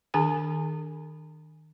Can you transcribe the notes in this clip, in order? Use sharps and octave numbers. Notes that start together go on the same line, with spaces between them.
D#3 D4 G#4 G#5 B5